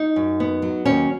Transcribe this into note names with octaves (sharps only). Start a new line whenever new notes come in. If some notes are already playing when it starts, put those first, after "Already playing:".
Already playing: D#4
F#2
B3
F#3
D#2 C#4